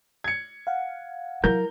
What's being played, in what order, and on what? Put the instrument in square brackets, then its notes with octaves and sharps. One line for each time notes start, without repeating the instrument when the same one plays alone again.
[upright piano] G#6 C#7
[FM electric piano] F5 F#5
[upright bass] F#3 E4 [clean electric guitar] A#4 [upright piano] G6